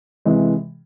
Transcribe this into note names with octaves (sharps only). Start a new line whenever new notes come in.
C3 E3 G#3